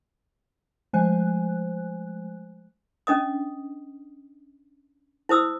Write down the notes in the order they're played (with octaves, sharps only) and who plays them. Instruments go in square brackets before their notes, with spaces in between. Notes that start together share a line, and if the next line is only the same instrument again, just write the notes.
[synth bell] F3 G#3 A3 C5 G#5 F#6
[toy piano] C#4 D4 D#5 D#6
E4 C5 D#6 E6